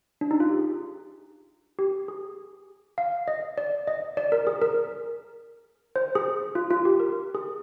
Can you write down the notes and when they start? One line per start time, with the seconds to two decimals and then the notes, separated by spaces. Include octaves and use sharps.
0.21 D4
0.31 D#4
0.40 F4
0.49 G4
0.59 G#4
1.79 G4
2.08 G#4
2.98 F5
3.28 D#5
3.58 D5
3.87 D#5
4.17 D5
4.32 A#4
4.47 G#4
4.62 A#4
5.96 C5
6.15 G#4
6.55 F4
6.70 F4
6.85 G4
7.00 A#4
7.35 G#4